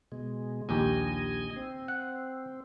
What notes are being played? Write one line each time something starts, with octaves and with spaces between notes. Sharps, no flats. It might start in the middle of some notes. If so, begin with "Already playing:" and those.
B2 G#3
A#1 D#2 G4 D#5 G#5
C4
F#5